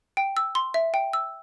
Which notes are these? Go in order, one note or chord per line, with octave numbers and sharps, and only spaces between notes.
G5
E6
C6
E5
G5
E6